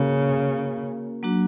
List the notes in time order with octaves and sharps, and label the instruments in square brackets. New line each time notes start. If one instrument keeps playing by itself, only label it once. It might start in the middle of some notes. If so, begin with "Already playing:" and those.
Already playing: [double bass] C#3 [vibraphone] A#3 C#4 F#4 A#4
[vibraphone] F#3 A#3 D4 F#4